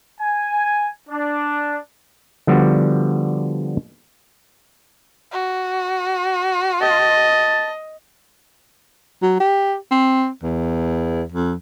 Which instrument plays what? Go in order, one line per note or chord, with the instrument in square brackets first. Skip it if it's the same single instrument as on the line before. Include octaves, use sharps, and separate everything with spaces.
[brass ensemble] G#5
D4
[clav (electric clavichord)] D3 F3 G3 B3 F#4
[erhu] F#4
[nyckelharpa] D#5 [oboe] A5
[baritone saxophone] F#3
G4
C4
E2
F2